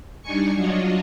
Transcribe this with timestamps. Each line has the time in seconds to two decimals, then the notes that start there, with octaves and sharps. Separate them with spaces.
0.22 G3 D4 D#4 G#5 C#6 C#7
0.55 F#3 D4 F4 F#4 C#5 D#5